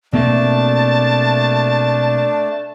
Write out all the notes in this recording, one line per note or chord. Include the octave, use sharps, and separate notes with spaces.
B2 A3 A#3 C4 D4 A5